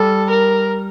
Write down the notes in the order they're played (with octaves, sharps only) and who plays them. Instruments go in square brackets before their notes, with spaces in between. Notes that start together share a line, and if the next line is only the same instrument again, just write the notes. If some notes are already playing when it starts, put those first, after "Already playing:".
Already playing: [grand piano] G3 [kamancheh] A4
[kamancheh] A#4